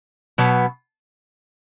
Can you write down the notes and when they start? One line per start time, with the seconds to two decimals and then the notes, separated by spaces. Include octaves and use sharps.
0.38 B2 F#3 B3